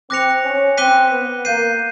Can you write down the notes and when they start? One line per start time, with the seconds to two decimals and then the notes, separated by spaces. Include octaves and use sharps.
0.10 C4 D6 F#6 A#6 C#7 F7
0.45 C#4
0.78 C4 D6 F#6 B6 D#7 G7
1.12 B3
1.45 A#3 G6 C7 D#7